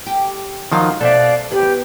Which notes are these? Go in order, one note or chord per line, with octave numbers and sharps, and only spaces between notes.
G4
D#3 F3 F#3 D#4 F4 F#4
B2 A4 C5 D5 E5 F5 F#6
E2 B3 G4 B4